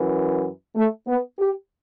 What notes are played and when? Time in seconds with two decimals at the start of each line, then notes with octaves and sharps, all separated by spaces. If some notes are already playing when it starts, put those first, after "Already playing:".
Already playing: F#2 E3
0.75 A3
1.07 B3
1.38 G4